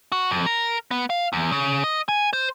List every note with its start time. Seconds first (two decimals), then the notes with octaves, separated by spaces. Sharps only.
0.12 F#4
0.31 F2
0.46 A#4
0.91 B3
1.10 F5
1.33 E2
1.52 C#3
1.84 D#5
2.08 G#5
2.33 C5